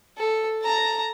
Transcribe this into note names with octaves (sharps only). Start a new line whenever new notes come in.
A4
A5 A#5